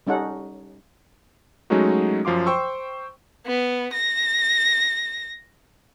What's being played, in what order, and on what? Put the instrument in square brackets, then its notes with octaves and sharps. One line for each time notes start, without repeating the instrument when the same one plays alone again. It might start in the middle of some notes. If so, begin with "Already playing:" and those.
[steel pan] G3 C#4 D#4 A4 F#5
[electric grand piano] F#3 G#3 A3 C#4 D#4 F#4
F#2 F3 F5 C6 D6
C5 G5 C6 C#6 E6
[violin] B3
A#6